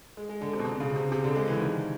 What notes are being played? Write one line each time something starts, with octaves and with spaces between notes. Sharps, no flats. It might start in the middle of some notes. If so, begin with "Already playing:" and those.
G#3
G#3
D3
C3
B2
C3
C#3
C3
C3
D3
G#3
E3
D#3